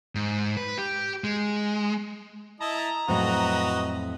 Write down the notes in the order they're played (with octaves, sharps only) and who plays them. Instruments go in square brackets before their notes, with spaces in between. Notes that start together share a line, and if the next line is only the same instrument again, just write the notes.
[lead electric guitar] G#2
B4
G4
G#3
[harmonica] E4 D#5 A5 [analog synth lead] A#5
[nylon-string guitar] F2 A2 F#3 [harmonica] F#4 B4 D#5